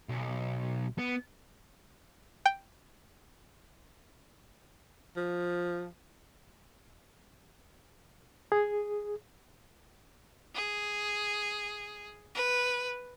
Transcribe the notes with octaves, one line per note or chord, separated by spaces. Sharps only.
B1
B3
G5
F3
G#4
G#4
B4